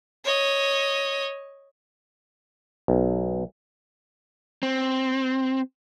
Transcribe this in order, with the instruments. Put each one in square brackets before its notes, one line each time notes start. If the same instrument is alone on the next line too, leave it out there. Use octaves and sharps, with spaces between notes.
[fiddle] C#5 D#5
[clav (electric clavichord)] B1
[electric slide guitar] C4